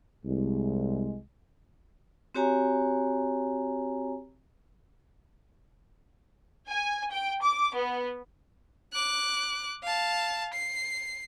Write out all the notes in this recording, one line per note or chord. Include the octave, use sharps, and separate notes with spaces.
C2 G#3
C4 F#4 G4 C#5 G#5 A#5
G#5
G5
D6
B3
D6 F#6
F5 A5
C7